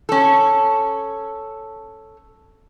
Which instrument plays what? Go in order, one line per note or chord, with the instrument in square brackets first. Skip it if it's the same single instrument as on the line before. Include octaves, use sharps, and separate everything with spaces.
[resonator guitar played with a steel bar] C#4 A4